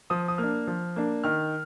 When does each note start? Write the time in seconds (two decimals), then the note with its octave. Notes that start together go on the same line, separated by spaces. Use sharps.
0.10 F3 D#6
0.28 D#6
0.38 A#3 D4 F6
0.67 F3
0.96 A#3 D4
1.24 D#3 F6